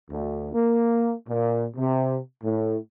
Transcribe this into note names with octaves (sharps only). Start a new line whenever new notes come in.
D2
A#3
A#2
C3
A2